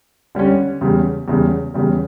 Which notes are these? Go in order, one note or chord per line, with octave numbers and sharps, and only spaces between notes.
D3 G3 C#4
E2 C#3 G3
E2 C#3 G3
E2 C#3 G3